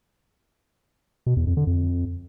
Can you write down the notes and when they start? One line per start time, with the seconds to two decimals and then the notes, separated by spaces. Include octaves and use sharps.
1.26 B2
1.37 E2
1.47 F2
1.57 D3
1.67 F2